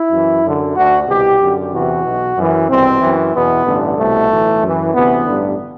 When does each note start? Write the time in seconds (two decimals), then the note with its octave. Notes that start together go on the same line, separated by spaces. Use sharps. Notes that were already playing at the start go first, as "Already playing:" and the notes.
Already playing: E4
0.11 F#2 E3
0.44 F#2 D3
0.76 D2 D3 F#4
1.08 C2 B2 G4
1.40 F#2 D3
1.73 E2 C3 E3 F#4
2.05 B1 B2
2.37 F#2 E3
2.69 C2 B2 C4
3.01 F#2 E3
3.33 E2 B2 B3
3.66 A1 G2 D3
3.98 C2 B2 A3
4.29 B1 A2 E3
4.62 F#2 E3
4.94 D2 C3 E3 B3
5.27 A1 G2 D3